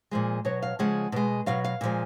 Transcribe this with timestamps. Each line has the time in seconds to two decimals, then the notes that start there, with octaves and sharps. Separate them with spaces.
0.11 A#2 F3 G#3
0.45 B2 F#3 C#5
0.62 F5
0.79 C#3 F3 G#3 F#5
1.12 B2 G#3
1.46 B2 F#3 F5
1.64 F5
1.81 A#2 F3 G#3